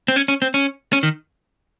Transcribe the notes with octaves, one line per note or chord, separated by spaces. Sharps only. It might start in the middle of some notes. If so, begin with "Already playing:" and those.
C4
C#4
C#4
C4
C#4
C#4
D#3